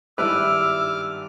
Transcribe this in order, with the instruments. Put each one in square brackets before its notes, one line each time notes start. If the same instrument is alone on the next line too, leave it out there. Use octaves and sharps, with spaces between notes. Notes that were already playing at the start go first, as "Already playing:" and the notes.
[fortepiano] G#1 B4 [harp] G2 E4 [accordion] D6 F6 [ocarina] E6